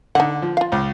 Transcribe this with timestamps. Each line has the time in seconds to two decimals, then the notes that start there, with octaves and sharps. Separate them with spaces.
0.15 D3 D#4 F#5
0.42 F3
0.57 F4 F5
0.72 C#2